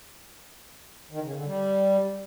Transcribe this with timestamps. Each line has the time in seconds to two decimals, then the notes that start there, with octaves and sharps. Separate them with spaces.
1.11 D#3
1.23 C#3
1.34 D3
1.46 G3